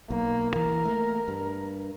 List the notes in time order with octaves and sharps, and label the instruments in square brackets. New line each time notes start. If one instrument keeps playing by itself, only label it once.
[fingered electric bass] B1 [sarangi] A#3
[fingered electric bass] E3 [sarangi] A#4
[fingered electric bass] A3 A#3
G2